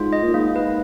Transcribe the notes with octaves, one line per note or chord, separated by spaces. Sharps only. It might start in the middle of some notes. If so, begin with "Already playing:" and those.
Already playing: G#2 F4
D#5
A#2
G#2 A#3
B4